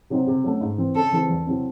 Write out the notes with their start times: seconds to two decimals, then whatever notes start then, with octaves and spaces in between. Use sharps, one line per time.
0.10 C3 F#3 C4 D#4
0.27 C3
0.44 F#3 A3 C#4
0.61 G#2
0.78 E3 C4
0.95 C#3 A4
1.12 E3 G#3 C4
1.29 E2
1.47 C3 F#3 C4 E4